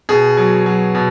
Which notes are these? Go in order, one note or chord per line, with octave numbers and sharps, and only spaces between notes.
B2 G#4
F#3
F#3
B2